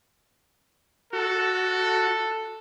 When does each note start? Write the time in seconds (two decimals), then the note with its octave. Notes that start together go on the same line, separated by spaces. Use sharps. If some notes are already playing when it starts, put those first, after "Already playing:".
1.13 F#4 A4